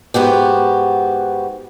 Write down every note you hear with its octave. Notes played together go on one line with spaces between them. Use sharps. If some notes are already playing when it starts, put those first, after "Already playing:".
G#2 B3 F#4 G4